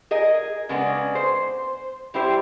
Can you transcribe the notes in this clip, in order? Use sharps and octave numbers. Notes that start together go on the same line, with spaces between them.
G#4 A#4 D#5
C#3 G#3 B3 D4
C5
G3 E4 G4 C5